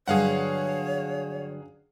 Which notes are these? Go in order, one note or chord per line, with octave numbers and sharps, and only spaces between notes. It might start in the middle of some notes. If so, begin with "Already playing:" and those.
G2 D3 F#3 G#4 C#5 F5 F#5